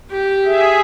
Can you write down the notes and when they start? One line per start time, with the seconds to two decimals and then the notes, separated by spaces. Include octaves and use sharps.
0.10 G4
0.45 G#4 E5